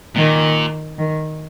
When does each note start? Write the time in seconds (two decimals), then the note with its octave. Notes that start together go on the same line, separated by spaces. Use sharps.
0.15 A#2 D#3
0.98 D#3